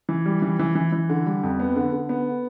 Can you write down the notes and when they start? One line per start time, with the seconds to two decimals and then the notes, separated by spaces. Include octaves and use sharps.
0.09 E3
0.26 G3
0.42 E3
0.59 E3
0.75 E3
0.92 E3
1.09 D3
1.26 G3
1.43 F2
1.60 B3
1.76 D3
1.92 D3
2.09 B3